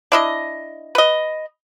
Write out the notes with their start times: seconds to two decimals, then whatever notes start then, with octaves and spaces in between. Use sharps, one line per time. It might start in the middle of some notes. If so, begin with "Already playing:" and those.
0.12 D4 E4 D#5
0.95 B4 D#5